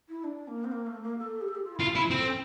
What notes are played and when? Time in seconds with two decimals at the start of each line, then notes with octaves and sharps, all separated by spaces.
0.09 E4
0.24 D4
0.48 A#3
0.64 C4
0.72 A#3
0.87 A3
1.03 A#3
1.18 A4
1.41 G4
1.48 A4
1.55 G4
1.64 F4
1.76 E4 F4
1.88 F4
1.96 E4
2.11 C4 A4